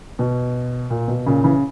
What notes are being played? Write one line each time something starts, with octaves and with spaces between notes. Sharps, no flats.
B2
A#2
B2
A#2 C#3
C#3 E3